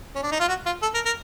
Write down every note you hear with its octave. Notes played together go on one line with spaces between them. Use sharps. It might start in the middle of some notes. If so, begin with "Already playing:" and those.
C#4
D4
D#4
F4
F#4
F4
A4
A#4
A#4